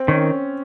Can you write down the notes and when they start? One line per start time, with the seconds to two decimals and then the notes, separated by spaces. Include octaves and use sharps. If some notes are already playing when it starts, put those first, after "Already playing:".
Already playing: C4
0.08 D#3 C#4